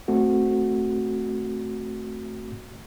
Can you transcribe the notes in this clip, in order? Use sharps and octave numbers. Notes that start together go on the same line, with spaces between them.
A3 C4 F#4